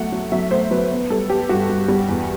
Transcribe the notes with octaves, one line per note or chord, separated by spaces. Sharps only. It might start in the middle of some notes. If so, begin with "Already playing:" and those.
Already playing: F#3 A3 F#5
F#3
F#3 E5
A3 C5
F#3 B4
B3
G3 A4
B3 G4
G2 F#4
G2
G3
E2